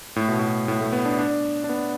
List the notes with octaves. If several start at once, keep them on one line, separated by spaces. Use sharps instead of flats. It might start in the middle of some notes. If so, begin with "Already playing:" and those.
A2
B2
A2
A2
A3
B3
D4
D4
D4
B3